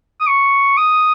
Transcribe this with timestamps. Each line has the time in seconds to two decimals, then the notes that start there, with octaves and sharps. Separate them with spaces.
0.21 D#6
0.27 C#6
0.77 D#6